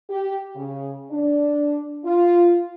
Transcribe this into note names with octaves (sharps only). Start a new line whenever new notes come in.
G4
C#3
D4
F4